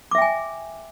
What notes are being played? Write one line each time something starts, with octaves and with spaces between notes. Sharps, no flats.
E5 G5 G#5 D6